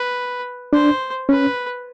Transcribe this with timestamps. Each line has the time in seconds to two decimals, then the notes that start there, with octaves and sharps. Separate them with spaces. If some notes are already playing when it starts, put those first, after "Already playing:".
Already playing: B4
0.73 D4 C5
1.29 C#4 B4